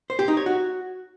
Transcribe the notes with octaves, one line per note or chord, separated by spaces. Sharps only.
C5
G4
D#4
C#5
F#4